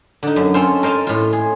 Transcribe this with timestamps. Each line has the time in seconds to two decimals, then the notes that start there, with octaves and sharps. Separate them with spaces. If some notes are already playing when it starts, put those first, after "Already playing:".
0.23 D3 D#4
0.36 F#2
0.54 C4 C#4 F4 A4 C5
0.83 A#4 C5 D#5 F5 A5
1.07 A2 F4
1.33 G#4